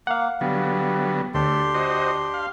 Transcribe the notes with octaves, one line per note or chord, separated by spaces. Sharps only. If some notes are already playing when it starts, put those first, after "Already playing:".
A#3 F5 F#5
D3 F#3 G3 B3
D2 A3 D4 G4 C6
F#4 C5 D#5
F5